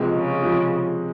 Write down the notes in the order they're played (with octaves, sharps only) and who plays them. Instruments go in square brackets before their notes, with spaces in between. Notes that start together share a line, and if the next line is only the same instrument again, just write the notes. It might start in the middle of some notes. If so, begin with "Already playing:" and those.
Already playing: [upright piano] C#2 C3 F3 G#3
[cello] C#3
[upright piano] C3 F3 G#3